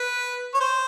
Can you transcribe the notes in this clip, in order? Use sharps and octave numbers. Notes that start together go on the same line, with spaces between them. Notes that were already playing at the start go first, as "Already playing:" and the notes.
Already playing: B4
C#5
C5